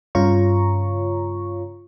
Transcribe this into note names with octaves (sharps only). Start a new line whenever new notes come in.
G2 C#3 F4 C#5 A#5 C#6